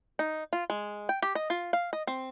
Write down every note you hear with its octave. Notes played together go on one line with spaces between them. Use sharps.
D#4
F4
G#3
G5
G4
D#5
F4
F5
D#5
C4